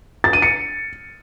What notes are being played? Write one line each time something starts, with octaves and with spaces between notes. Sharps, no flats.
A6
D#7
C#7